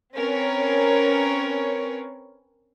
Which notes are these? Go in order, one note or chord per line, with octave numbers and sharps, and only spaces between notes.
C4 C#4 A#4 B4 C#5